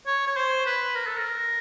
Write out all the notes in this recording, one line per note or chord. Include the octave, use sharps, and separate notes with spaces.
C#5
C#5
C5
B4
A#4
A4
A#4